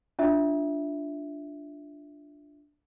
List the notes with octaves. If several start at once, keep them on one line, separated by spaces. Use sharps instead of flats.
D4 F4 E5